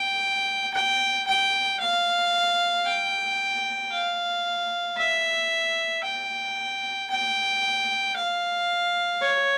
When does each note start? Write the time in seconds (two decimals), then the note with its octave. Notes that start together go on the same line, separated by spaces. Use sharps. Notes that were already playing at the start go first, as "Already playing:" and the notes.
Already playing: G5
0.74 G5
1.27 G5
1.80 F5
2.86 G5
3.92 F5
4.97 E5
6.04 G5
7.10 G5
8.17 F5
9.22 C#5